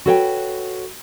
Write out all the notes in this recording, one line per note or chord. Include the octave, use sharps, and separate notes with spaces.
F#4 A4 B4 C#5 F#5 G5